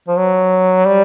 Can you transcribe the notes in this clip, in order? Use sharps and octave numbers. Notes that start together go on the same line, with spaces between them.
F3
F#3
G3